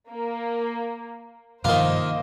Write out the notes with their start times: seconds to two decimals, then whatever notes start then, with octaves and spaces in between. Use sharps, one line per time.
0.10 A#3
1.64 G2 C3 D#3 F3 A#3 F4 C5 D#5